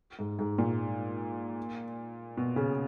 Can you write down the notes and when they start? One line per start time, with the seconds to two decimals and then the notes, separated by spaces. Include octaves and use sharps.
0.19 G#2
0.39 G#2
0.59 A#2
2.37 B2
2.56 C#3